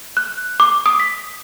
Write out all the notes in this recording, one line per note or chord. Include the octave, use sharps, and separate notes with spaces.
F#6
D6
D#6
B6